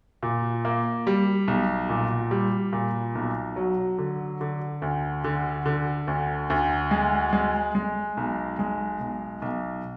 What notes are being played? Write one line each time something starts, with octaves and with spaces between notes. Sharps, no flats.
A#2
A#3
G3
B1
A#2
G3
A#2
B1
F#3
D3
D3
D2
D3
D3
D2
D2
G#3
G#3
G#3
B1
G#3
B1
B1